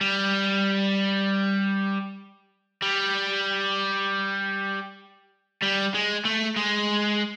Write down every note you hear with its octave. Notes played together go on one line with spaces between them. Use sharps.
G3
G3
G3
G#3
A3
G#3